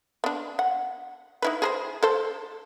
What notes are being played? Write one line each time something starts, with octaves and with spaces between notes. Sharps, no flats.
B3 D4
F#5
D#4 E4 B4
G#4 A#4 C5
A4 C5